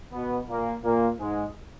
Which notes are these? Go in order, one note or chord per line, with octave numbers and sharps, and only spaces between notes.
B2 B3
A#2 A#3
A#2 A#3
G#2 G#3